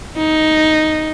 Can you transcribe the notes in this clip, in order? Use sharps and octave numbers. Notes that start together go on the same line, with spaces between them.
D#4